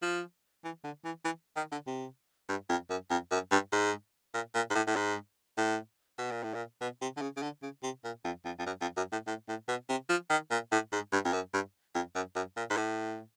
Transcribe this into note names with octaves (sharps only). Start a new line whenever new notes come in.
F3
E3
D3
E3
E3
D#3
D3
C3
G2
F2
F#2
F2
F#2
G2
G#2
A#2
A#2
G#2
A2
A2
G#2
A2
B2
A#2
A2
A#2
B2
C3
D3
C#3
C#3
D3
C#3
C3
A#2
F2
F2
F2
F#2
F2
F#2
A2
A2
A2
B2
C3
F3
D#3
A#2
A2
G#2
G2
F2
F#2
G2
F2
F#2
F#2
A#2
G#2
A2